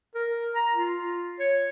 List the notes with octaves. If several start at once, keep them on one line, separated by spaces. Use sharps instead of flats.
A#4
A#5
F4
C#5